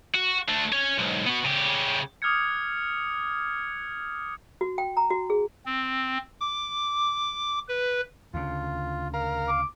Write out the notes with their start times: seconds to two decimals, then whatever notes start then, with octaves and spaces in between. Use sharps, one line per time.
0.14 F#4
0.49 A3 D4
0.72 C#4 C#5
0.98 B1 G#2
1.26 B3 F#4
1.45 C#3 G4
2.22 D6 D#6 F6 F#6 G#6 C#7
4.61 F#4
4.78 G5
4.97 A#5
5.10 F#4
5.30 G#4
5.66 C4
6.40 D6
7.69 B4
8.34 D2 C#3 F4
9.14 A#4 F5
9.48 D6